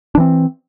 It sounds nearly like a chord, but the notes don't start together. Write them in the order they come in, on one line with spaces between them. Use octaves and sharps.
D4 E3 C4